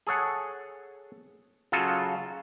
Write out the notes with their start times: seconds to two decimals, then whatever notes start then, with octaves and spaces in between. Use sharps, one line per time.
0.07 G#4 A4 C#5 F#5
1.72 C#3 F#3 F4 F#4 A4